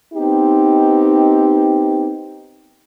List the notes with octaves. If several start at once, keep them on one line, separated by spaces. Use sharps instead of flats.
B3 C4 D#4 G4